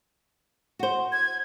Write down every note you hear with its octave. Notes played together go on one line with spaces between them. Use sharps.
F#4 C5
G#6